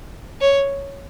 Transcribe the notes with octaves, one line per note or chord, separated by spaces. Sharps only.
C#5